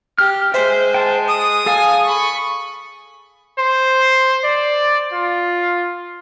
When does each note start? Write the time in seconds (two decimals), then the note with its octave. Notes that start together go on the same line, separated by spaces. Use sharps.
0.18 G4 F6
0.54 G#3 C5 E5
0.94 G5 A5
1.28 D#6
1.66 G#4 A4 F5 G#5
2.03 B5 C#6
3.59 C5
4.44 D5
5.13 F4